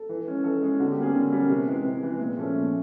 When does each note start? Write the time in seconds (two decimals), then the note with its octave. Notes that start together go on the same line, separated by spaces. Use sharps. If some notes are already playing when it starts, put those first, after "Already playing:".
Already playing: A4
0.09 E3
0.27 G#3 C#4
0.44 E3 A4
0.61 G#3 C#4 G#4
0.79 D3 F#4
0.91 G4
0.97 G3 A#3 C#4 G#4
1.15 D3
1.32 G3 A#3 C#4
1.49 C3
1.67 E3 G#3
1.85 C3
2.03 E3 G#3
2.19 A#2
2.37 F3 A3 C#4
2.56 A#2